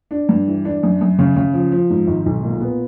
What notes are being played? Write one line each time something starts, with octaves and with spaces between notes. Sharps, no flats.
D4
G2
E3
D4
F#2
F#2
C#3
C#3
F3
F3
G#2
G#1
B1
A#2
B3